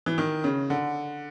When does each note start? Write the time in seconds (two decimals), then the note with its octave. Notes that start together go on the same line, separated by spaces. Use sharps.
0.06 E3
0.18 D#3
0.44 C#3
0.70 D3